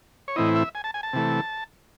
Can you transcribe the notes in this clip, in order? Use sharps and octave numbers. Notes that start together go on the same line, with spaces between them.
C#5
A2 E3 C4 E4 D#5
E5
G#5
A5
G#5
A5
C3 E3 A3